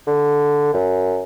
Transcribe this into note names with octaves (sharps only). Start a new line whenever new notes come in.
D3
F#2